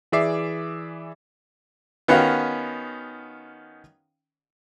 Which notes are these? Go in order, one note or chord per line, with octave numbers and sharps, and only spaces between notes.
E3 G#4 D5 E5 D6 C7
D#3 B3 C#4 F#4 D#5 F5